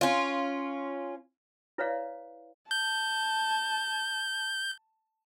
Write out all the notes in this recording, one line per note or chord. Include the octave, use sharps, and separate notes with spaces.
C#4 F4
E4 B4 C#5 D5 F5
A5 G6